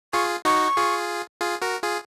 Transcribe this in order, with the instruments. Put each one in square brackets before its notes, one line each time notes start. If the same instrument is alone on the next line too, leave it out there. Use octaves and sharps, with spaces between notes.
[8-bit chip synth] F4 G#4 [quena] C#6
[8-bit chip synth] D#4 F#4 [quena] C#6
[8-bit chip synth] F4 G#4
F4 G#4
F#4 A#4
F4 G#4